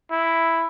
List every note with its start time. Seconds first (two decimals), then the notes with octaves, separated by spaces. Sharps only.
0.11 E4